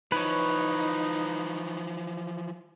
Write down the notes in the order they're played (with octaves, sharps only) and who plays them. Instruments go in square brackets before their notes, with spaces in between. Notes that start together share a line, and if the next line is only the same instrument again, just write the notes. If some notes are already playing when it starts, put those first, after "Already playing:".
[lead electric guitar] E3 F3 [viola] D#4 [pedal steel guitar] B4 C#5